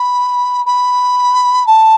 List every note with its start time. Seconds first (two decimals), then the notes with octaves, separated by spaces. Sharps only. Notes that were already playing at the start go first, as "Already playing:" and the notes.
Already playing: B5
0.66 B5
1.67 A5